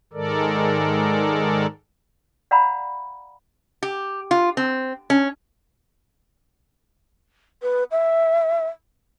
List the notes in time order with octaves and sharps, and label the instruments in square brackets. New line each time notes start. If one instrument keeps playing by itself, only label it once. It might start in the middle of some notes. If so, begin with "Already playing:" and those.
[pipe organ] G#2 D#3 G#3 A4 A#4 D5
[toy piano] D5 F5 F#5 A#5 B5
[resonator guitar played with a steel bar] G4
F4
C4
C#4
[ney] B4
E5